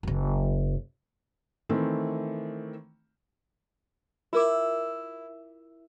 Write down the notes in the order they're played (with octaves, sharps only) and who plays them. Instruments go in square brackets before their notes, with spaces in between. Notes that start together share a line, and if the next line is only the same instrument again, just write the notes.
[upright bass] F#1 F#2
[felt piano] D#3 E3 A3 C4
[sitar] E4 [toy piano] F4 A#4 D6